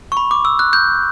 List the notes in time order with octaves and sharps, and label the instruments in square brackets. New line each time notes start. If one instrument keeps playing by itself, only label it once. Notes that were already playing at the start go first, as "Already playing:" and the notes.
[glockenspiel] C#6
B5
D6
E6
F#6
G6